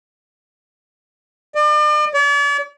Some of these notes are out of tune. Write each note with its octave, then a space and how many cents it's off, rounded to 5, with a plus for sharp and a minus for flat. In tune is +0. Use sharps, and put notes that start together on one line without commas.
D5 +40
D5 -45